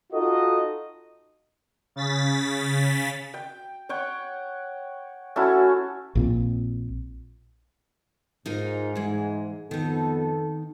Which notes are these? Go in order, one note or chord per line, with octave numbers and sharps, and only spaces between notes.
D#4 F4 F#4 A4 D#5
C#3 A6 B6
G5
C#5 F#5 G5
A3 C#4 E4 F#4
A#1 A#2 C4
G#2 D#4 F4 A#4
E3 G#3
F2 D#3 B3 D#4 A4